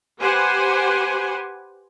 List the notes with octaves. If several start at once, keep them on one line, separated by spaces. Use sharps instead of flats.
G4 B4 C5 F#5 G#5